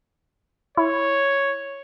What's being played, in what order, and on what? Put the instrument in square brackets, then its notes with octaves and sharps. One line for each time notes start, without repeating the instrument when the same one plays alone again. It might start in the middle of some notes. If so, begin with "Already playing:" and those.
[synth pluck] E4 [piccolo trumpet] C#5